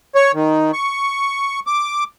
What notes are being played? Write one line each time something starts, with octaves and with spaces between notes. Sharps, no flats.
C#5
D#3
C#6
D6